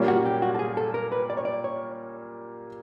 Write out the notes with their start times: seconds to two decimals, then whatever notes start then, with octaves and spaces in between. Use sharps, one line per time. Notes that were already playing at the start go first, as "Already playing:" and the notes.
Already playing: A#2 G3 A#3 C#4
0.08 F#4
0.25 G4
0.42 F#4
0.55 A4
0.59 G#4
0.77 A4
0.94 A#4
1.12 B4
1.30 D5
1.37 C#5
1.45 D5
1.64 C#5